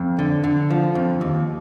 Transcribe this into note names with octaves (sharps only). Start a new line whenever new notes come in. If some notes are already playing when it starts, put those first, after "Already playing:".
Already playing: F2
D3
D3
F3
F2
D#2